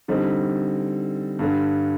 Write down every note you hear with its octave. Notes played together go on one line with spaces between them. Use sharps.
D3 G3 C4 D#4
G2 D3 G3